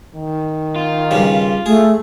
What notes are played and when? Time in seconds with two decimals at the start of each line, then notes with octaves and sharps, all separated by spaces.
0.16 D#3
0.76 F4
1.11 G2 C#3 G3
1.66 A3 G#4